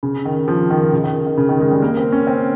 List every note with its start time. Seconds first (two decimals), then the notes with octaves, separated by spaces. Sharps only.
0.03 C#3
0.25 D#3
0.48 F3
0.70 D#3
0.93 C#3
1.04 D#3
1.27 D#3
1.38 C#3
1.49 D#3
1.60 G#3
1.71 G3
1.82 A#3
1.97 C4
2.12 C#4
2.27 C4